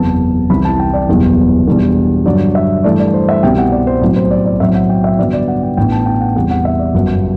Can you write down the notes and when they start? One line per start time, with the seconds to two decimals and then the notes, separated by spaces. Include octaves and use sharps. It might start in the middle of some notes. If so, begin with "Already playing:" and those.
Already playing: F#1 E2 C3 E3 B3 A5
0.50 C2 C3 E3 B5
0.65 A5
0.79 G5
0.94 D5
1.09 F#1 E2 B2 G3
1.67 E2 B2 G3 D4
2.25 G2 D3 F#3 D5
2.55 E5
2.84 G2 E3 A3 D5
2.99 D5
3.14 C5
3.29 E5
3.43 C2 B2 G3 C4 G5
3.58 F#5
3.72 D5
3.87 C5
4.01 B1 A2 F#3 C4 D5
4.16 C5
4.31 D5
4.45 D5
4.60 B1 A2 F#3 C4 E5
4.75 F#5
4.89 G5
5.04 E5
5.19 G2 D3 F#3 B3 D5
5.33 D5
5.48 F#5
5.63 G5
5.77 A1 A2 E3 B3 D4 G5
5.92 A5
6.06 G5
6.21 F#5
6.36 E2 C3 E3 G3 F#5
6.51 F#5
6.65 E5
6.79 D5
6.94 G1 F#2 F#3 F#5